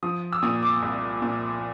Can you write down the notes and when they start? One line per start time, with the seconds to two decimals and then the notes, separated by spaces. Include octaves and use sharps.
0.03 F3 D#6
0.33 E6
0.43 A#2 D#6
0.63 D6
0.82 C2
1.22 A#2